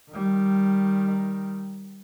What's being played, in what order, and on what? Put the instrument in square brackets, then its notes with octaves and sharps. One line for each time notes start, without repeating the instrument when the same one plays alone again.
[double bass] D#3 G3